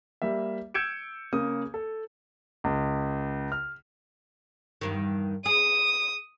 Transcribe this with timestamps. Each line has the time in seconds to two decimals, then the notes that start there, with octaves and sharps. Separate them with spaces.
0.22 G3 A#3 E5
0.74 E6 G6 G#6 C#7 D7 E7
1.32 C#3 A#3 D#6
1.74 A4
2.64 C#2
3.52 F6
4.81 E2 G2 D#3
5.46 G#4 D#6